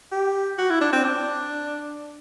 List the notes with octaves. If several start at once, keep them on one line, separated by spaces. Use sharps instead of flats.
G4
F#4
E4
D4
C4
D4